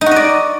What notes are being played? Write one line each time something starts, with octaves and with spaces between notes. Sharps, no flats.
D#4
F#4
D#5
D5